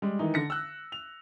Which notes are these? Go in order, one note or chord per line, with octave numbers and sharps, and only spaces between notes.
G3 G#3
D#3 E3 D#4
D3 A#6 C#7
E6 F#6
F7